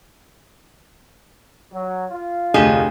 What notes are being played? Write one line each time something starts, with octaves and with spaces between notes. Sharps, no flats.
F#3
F4
F1 D2 G4 G#4 D#5 E7